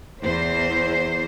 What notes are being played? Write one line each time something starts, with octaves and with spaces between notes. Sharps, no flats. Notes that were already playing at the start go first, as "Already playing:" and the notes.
E2 C5